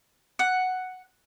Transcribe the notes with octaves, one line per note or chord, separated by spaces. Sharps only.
F#5